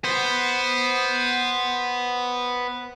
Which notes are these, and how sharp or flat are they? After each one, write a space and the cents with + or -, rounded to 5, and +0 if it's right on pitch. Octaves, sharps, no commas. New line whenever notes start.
B3 +0 C5 +0